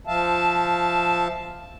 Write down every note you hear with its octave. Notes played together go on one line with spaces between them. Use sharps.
F3 E5 F5 A5